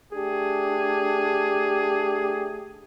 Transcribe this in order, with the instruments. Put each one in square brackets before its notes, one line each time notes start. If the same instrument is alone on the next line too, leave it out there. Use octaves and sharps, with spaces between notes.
[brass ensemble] A3 D4 G4 G#4